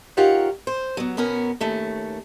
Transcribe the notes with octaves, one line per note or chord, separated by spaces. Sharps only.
D#4 F4 G4 A#4 C#5 F#5
C5
F#3 B3
B2 B3 C#4 A#4
D#2 A3 C#4